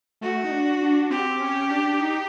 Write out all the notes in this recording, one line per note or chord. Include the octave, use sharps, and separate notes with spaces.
A3 F#4
D#4
D4
D4
C4 G4
C#4
D4
D#4